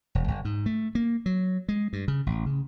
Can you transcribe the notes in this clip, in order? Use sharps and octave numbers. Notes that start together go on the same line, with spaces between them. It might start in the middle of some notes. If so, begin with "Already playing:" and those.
E1
G1
G#2
A3
A#3
F#3
G#3
G2
C#3
A1
C#3